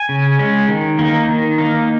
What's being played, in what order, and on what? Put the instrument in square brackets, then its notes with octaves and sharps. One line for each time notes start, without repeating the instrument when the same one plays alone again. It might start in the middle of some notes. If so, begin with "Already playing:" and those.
Already playing: [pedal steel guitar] G#5
C#3
G#3 C#4
D#3
A#3 D#4
D#3
A#3 D#4